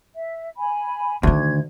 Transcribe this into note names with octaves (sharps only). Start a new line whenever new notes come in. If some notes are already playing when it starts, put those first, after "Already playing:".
E5
G#5 B5
D2 D3 D#3 G#6